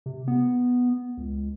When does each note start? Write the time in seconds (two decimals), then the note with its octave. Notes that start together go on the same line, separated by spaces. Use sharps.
0.06 C3
0.28 B3
1.17 C#2